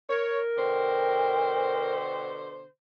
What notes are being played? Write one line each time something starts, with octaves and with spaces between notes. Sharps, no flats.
A#4 C#5
B2 D3 C5 G5